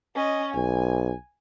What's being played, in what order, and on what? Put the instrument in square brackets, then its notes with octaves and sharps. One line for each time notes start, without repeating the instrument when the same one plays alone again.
[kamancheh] C#4 D#5
[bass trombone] B1 [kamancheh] G#5